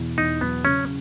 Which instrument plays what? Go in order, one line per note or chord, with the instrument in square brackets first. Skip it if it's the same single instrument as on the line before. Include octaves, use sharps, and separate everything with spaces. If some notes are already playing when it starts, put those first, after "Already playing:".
Already playing: [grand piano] E2 B2 E4
[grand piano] E2 [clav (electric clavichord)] D#4
[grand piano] F#3 [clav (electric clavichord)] B3
[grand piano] C#3 [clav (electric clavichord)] C#4